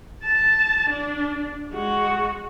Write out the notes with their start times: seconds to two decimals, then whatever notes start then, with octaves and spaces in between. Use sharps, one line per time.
0.23 A5
0.90 D4
1.72 G#3 F#4